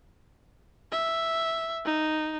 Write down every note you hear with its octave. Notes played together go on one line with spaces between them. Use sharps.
E5
D#4